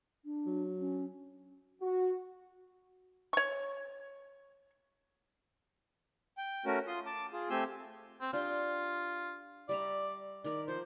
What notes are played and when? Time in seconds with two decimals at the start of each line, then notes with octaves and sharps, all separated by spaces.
0.24 D4
0.46 F#3
0.79 C#4
1.82 F#4
3.33 C#5 C#6
6.38 G5
6.65 A3 C#4 F#4 A#4
6.87 F4 C6 D#6
7.06 A5 D6
7.33 F4 G#4
7.50 A3 C4 G4 G#5 C6 E6
8.21 C4
8.33 D4 F4 G4 C6
9.69 G3 D5 E5 A#5
10.44 D#3 A#4 D5 B5
10.68 F3 C5